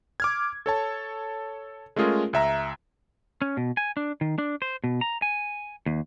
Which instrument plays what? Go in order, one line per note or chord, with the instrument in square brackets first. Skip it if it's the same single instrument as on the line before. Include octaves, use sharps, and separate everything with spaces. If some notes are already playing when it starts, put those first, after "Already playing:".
[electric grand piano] D6 F6 G#6
A4 C#5 A5
G#3 A3 C#4 F4 G#4 A#4
C#2 E5 A#5
[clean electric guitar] C#4
B2
G#5
D4
D#3
D4
C5
B2
A#5
G#5
D#2